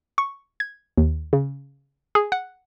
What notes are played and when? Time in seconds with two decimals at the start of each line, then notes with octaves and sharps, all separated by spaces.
0.18 C#6
0.60 G#6
0.98 D#2
1.33 C#3
2.15 G#4
2.32 F#5